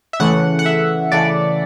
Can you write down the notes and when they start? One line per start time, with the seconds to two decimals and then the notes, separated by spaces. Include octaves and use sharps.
0.13 E5
0.20 C#3 E3 A3 F#5
0.59 F#5
0.66 E5
1.12 C#3 E3 A3 D5